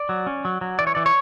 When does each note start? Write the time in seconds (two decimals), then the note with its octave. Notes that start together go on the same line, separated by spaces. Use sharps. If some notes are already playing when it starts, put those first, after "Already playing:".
Already playing: D5
0.09 F#3
0.27 C#4
0.45 F#3
0.61 F#3
0.79 E3 D5
0.87 C#5
0.95 E3 D5
1.06 C#5